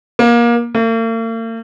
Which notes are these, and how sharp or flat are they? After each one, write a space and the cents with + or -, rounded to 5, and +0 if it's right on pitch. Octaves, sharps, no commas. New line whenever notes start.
A#3 +25
A#3 -45